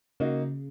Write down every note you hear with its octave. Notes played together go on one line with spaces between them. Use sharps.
C#3 A#3 D#4 F#4